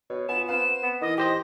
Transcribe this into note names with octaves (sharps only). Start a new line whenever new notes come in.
B2 C#5
B3 F4 G#5 E7
C4 B4 F5 E7
B3
D#3 E3 D#5 D6 D#6
G4 C5 D#5 A#6